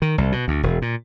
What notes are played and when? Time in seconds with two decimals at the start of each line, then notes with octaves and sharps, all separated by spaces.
0.02 D#3
0.18 C2
0.32 B2
0.48 D2
0.63 E1
0.82 A#2